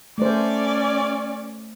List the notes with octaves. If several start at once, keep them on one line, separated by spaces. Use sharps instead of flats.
A3 C#4 C5 D5